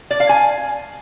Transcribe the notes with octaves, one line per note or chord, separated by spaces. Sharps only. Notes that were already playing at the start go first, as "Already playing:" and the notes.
D5
F5
G#5